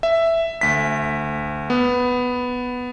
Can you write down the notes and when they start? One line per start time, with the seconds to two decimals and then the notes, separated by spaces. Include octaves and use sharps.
0.03 E5
0.61 D2 B6
1.70 B3